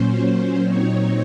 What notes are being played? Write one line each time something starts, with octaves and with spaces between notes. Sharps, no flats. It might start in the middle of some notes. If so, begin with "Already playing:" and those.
Already playing: A#2 F#3 C#4 C5
C5
A#2 F#3 C4 D#4 C#5